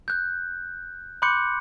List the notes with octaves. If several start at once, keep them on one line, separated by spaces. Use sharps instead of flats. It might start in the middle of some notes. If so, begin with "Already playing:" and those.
F#6 G6
B5 C6 D6 F#6 G6 C#7